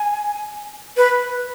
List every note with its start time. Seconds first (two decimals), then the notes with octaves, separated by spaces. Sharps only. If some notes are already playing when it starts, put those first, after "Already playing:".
Already playing: G#5
0.97 B4